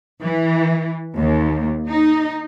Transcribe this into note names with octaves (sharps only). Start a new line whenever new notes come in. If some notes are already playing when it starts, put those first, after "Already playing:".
E3
D#2
D#4